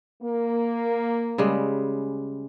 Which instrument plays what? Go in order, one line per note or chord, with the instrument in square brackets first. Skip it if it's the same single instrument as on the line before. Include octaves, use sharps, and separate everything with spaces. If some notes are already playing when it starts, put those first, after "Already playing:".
[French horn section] A#3
[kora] C#3 G3 G#3